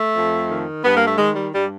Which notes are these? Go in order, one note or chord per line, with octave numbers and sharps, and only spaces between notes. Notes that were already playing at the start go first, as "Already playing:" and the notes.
Already playing: A3
F2
D#3
G2 B3
A#3
A3
D#3 G#3
G3
G2 G3